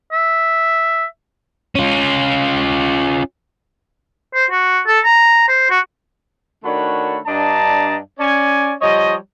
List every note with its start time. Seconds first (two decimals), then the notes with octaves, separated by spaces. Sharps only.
0.12 E5
1.75 C#4 F4
4.34 C5
4.50 F#4
4.87 A4
5.05 A#5
5.48 C5
5.70 F#4
6.64 D#3 A3 D4 F#4 C#5 B5
7.27 G2 D4 D#5 A5 A#5
8.19 C#4 D5 G#5
8.82 F3 G3 C#5 D#5